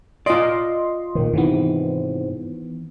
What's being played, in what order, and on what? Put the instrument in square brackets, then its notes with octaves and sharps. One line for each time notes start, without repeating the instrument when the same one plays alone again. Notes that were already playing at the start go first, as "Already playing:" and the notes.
[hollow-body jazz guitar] F4 D5 [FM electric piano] D#5 C6
[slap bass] A#2 D#3
[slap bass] G#2 C3 [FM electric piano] D#3 E3 B3